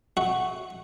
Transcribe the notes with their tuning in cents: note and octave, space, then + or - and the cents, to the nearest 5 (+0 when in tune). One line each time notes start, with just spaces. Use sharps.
F#4 +0 E5 -35